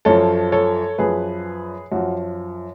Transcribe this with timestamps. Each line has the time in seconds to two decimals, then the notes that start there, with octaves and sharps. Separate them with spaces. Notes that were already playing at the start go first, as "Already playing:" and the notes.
0.05 F#2 F3 A4 C#5
0.52 A4 C#5
0.98 F#2 F3 G#4 B4
1.91 F#2 F3 F#4